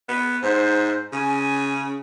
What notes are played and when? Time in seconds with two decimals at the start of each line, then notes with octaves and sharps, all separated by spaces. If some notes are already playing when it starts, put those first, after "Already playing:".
0.09 B3
0.42 G#2 C5
1.12 C#3 G#5